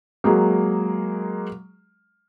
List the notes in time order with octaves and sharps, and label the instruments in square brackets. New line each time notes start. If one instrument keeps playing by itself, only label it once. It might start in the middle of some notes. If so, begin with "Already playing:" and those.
[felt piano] F#3 G#3 A#3